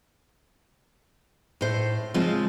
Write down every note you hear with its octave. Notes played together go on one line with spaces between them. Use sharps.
A2 C5
C#3 F3 G#3 C4 F4